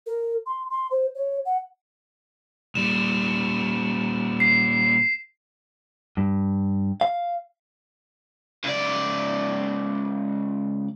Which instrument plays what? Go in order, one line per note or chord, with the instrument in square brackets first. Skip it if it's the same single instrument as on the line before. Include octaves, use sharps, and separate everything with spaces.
[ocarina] A#4
C6
C6
C5
C#5
F#5
[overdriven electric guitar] A#2 G3 [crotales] E7
[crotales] C7
[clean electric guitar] G2
F5
[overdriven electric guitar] C#2 D5